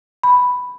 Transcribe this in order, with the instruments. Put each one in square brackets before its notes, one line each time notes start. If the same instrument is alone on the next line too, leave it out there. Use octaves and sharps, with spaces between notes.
[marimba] B5